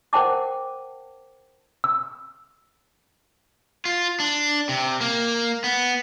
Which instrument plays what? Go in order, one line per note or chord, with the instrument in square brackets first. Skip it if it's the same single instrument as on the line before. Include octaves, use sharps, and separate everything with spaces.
[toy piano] A#4 C5 F#5 G5 A5 D6
[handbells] E6
[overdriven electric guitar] F4
D4
C3
A#3
B3